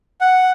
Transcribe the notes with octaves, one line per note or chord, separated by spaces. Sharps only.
F#5